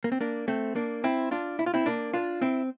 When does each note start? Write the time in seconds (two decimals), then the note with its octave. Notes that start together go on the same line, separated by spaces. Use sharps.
0.04 A#3
0.12 C4
0.21 A#3 D4
0.48 A3 C4
0.76 A#3 D4
1.04 C4 E4
1.31 D4 F4
1.59 E4
1.66 F4
1.74 C4 E4
1.86 A#3 D4
2.13 D4 F4
2.42 C4 E4